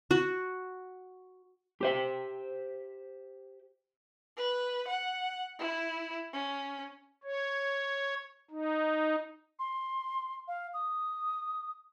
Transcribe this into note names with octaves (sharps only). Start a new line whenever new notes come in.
F#4
G4 C5 E5
B4
F#5
E4
C#4
C#5
D#4
C6
F5
D#6